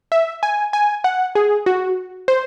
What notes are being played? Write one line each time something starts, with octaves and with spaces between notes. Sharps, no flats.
E5
G#5
G#5
F#5
G#4
F#4
C5